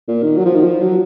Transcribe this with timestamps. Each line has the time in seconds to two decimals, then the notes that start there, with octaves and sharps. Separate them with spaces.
0.08 A#2
0.23 D#3
0.37 F#3
0.46 F3
0.55 D#3
0.63 F3
0.82 F#3